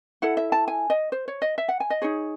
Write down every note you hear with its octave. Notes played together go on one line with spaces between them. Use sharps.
E4 A4 F#5
E5
A5
G#5
D#5
C5
C#5
D#5
E5
F#5
G#5
D#5
D#4 G#4 C#5